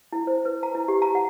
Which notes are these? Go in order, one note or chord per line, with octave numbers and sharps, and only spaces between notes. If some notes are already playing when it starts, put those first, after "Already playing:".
E4
C5
B4
A#5
E4
G4
A#5
F#5